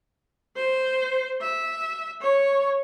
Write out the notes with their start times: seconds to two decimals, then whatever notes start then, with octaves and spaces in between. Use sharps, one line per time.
0.56 C5
1.41 E5
2.22 C#5